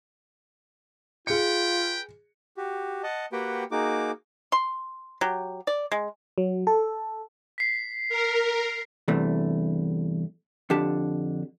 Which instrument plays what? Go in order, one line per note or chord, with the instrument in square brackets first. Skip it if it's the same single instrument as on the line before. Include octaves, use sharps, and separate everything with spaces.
[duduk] F4 [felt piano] G#4 C#7 [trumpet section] B4 G5
[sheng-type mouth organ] F#4 G4
D#5 F#5 A5
A#3 F#4 G4 B4 F#5 G5
A#3 D#4 F#4 G#4 D6
[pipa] C6
F#3 G4
D5
G#3
[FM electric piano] F#3
A4
[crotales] B6 C7
[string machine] A#4
[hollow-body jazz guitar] E2 G2 C3 E3 A3
F2 D3 G4 A5